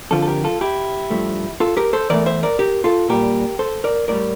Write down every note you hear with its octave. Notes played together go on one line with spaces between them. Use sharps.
F2 D3 F3 F4 A4
A4
G4 A#4
F4 A4
E4 G4
G2 F3 A3
F4 A4
G4 A#4
A4 C5
E2 E3 A3 A#4 D5
C5 E5
A#4 D5
G4 A#4
F4 A4
A#2 G3 G4 A#4
A4 C5
A#4 D5
A2 G3 A#4 D5